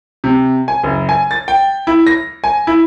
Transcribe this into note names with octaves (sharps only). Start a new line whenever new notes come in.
C3
G#5
F#1
G#5
A6
G5
E4
A#6
G#5
E4